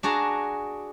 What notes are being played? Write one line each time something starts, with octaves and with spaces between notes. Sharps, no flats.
D4 F#4 G#4 A5 A#5